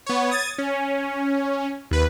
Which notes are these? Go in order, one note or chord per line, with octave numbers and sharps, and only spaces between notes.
B3 C#5
D#6 G#6 A6
C#4
D#2 B4